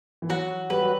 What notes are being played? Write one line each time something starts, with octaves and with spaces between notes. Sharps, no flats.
E3
F#3 F#4
G3 B4
F#3